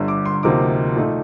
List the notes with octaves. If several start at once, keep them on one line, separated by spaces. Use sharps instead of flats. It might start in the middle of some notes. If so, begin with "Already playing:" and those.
Already playing: G1 G2 D3
D6
C6
D2 C3 F3 A#3 D#4 D6
A#2 A3 D#4